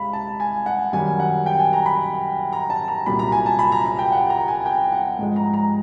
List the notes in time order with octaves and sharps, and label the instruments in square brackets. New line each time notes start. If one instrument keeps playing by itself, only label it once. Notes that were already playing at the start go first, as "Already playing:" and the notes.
Already playing: [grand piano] C2 G#3 F5 B5
A5
G#5
F#5
F#2 D#3 G3 G#5
F#5
G5
G#5
A#5
B5
A#5
A5
A#5
C2 A#2 F#3 B5
A#5
G#5
A5
B5
A#5
A#5
G5
F#5
A#5
G#5
G5
F#5
G#2 F3 G#3
A#5
A#5